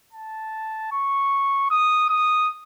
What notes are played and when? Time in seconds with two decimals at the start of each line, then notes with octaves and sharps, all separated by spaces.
0.13 A5
0.92 C#6
1.70 D#6
2.10 D#6